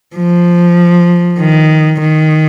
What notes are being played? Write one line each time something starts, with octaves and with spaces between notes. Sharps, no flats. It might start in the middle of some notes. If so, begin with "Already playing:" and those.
F3
D#3
D#3